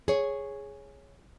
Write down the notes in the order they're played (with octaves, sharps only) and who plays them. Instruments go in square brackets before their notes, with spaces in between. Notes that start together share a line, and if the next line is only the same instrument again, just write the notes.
[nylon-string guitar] G#4 C#5